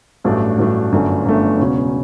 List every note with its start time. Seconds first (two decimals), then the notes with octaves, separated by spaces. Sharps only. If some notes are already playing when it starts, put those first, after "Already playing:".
0.24 A1 G2 F#3 A3 D4
0.59 A1 G2 F#3 A3 D4
0.92 G1 F#2 D3 A3 D4
1.25 G1 F#2 D3 A3 D4
1.59 E1 E2 C#3 F#3 C#4